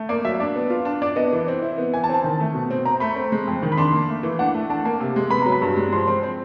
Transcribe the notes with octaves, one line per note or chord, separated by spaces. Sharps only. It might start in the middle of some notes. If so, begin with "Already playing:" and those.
Already playing: A3
A#3 D5
F#3 E5
D4 D5
B3
F4
D4
D4 D5
B3 D#5
E3
C4
E4
B3
E3 G#5
A5
C4
A5
D#3
A3
B2
C4
C4 A#5
A3 B5
C4
G#3
F2
D#3
B5
D4 C6
A#3
A3
E3
D4 F#5
A3
D4 A5
A#3
C3
G#3
B3 B5
F#3 A#5
B5
G2
G#3
F3 C6
C4
C4